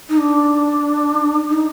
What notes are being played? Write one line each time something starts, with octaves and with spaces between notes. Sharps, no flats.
D#4
D4
D#4